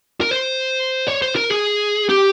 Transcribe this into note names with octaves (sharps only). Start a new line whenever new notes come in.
A#4
C5
C#5
C5
A#4
G#4
G4